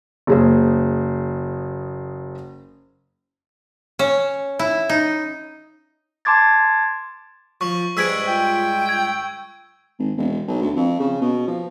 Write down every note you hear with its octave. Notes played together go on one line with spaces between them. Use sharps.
F#1 G#4 C5
C#4
E4
D#4
A5 C6 D6 G#6 A6
F3 C#6
G2 G#3 C5 B5 E6 G#6 D7
F4 G5
G#6
G#1
E1
B1
D2
F2
C#3
B2
F3